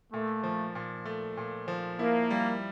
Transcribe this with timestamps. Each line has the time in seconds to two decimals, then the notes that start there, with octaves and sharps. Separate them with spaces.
0.13 A#2 A3
0.43 F3
0.75 A#2
1.05 A3
1.37 A#2
1.68 F3
1.99 A#3 E4
2.31 G3